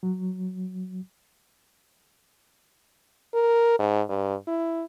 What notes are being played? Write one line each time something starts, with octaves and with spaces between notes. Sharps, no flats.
F#3
A#4
G#2
G2
E4